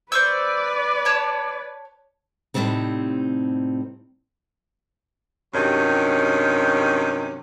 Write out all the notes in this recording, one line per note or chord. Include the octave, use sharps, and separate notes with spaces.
B4 C5 D5 C#6 E6
C#5 A5
A2 C3 E3 G3 C4 D#4
G2 C3 D#3 F#3 C#4 G4